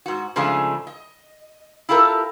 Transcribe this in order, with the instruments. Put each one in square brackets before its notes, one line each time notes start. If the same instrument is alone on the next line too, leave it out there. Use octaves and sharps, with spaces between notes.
[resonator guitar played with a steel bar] G#2 F#4
G#2 C#3 F3 A3 D4 G#5
D#5
E4 F4 G4 A4 A#4